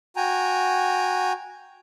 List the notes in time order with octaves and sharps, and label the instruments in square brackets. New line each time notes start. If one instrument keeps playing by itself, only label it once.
[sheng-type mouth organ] F#4 G5 G#5 A#5